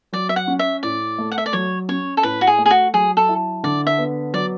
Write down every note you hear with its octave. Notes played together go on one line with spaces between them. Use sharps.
F#3 D5
E5
F#5
C#4
E5
A2 D5
A3
F#5
E5
D5
F#3 C#5
C#4 C#5
A4
A2 B4
F#4
G#4
A3
G#4
F#4
F#3 G#4
A4
E4
D3 D5
E5
B3
F#3 D5